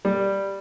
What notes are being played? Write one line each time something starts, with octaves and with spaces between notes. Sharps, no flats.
G3